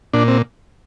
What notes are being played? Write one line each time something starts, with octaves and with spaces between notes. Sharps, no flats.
A#2 D4
C4